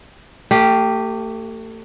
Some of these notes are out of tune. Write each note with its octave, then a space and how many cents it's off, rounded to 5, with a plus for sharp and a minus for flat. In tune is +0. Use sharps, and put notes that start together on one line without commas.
A3 +35 G4 +0 F5 -5